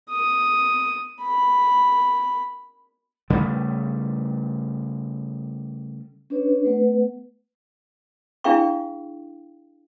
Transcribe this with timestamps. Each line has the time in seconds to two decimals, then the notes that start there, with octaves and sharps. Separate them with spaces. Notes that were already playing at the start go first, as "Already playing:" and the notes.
0.10 D#6
1.22 B5
3.30 C#3 G3 A3
6.30 C#4 D4 B4 C#5
6.65 A3 B3 B4 F#5
8.44 D4 E4 G#4 F5 G5 C#6